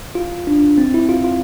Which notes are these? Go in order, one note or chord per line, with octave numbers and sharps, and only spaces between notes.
F4
D4
C4
E4
F4
F4